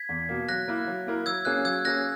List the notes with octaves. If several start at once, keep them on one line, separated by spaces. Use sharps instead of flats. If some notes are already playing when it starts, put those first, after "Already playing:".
Already playing: G#6 B6
E2
B2 A#3
F#3 F#6 A#6
A#3 E4 A#4
F#3
A#3 E4 A#4
F#3 E6 G#6
A#3 C#4 G#4 F#6
F#3 E6 G#6
A#3 C#4 G#4 F#6 A#6